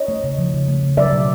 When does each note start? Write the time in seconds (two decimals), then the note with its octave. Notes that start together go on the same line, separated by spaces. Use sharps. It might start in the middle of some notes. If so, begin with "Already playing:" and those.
Already playing: C#5 D#5
0.08 A3
0.24 C#3
0.38 F3
0.54 C#3
0.68 A3
0.83 C#3
0.97 F#3 D5 E5
1.12 B2